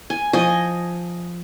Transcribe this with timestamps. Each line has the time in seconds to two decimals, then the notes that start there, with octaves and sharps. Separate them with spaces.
0.10 G#5
0.33 F3 D#5 G#5